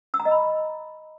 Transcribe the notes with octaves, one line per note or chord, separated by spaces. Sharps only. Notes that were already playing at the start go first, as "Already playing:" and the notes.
E6
A#5
D#5
B5